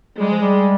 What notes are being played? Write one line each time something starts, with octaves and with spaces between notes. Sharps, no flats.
G3 G#3
F3
G3